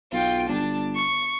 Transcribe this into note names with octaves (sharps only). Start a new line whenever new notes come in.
B1 F4 G5
G1 D4 A5
C#6